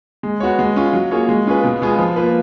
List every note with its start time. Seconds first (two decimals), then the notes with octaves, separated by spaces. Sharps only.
0.23 G#3
0.40 B3 F#4 C#5
0.59 G#3
0.76 C#4 F4
0.93 F#3
1.11 A#3 F4 G#4 C#5
1.29 G#3
1.47 C#4 F4 G#4 B4
1.63 B2
1.82 G#3 B3 F4 G#4
1.98 F3
2.16 A#3 F4 B4